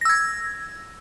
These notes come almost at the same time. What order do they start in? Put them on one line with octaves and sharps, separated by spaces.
A#6 E6 G#6